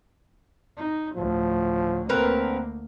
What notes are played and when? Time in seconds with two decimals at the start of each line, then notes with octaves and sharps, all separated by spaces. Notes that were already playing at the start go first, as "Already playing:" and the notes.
0.77 D#4
1.16 D2 A2 F3
2.09 D2 D3 A#3 C4 A#4 B4